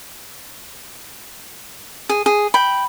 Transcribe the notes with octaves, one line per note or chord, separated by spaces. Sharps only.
G#4
G#4
G5 B5